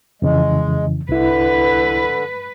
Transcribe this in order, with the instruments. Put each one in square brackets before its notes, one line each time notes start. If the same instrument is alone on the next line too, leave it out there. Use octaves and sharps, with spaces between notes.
[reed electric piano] F2 C#3 E3 [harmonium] G#3
[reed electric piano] C2 E4 [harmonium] D3 [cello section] B4